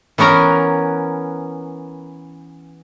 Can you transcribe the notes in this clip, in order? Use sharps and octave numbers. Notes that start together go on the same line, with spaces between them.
E3 B3 C#4 A#4 A#5